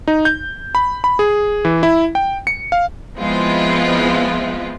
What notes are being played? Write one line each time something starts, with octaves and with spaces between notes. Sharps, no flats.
D#4
G6
B5
B5
G#4
E3
E4
G5
C#7
F5
F3 G#3 B3 C4 E4 F4